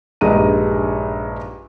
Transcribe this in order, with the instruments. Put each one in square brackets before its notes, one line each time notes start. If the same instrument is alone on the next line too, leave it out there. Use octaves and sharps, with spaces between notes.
[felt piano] A#1 G2 G#3 D#4 A#5 D#7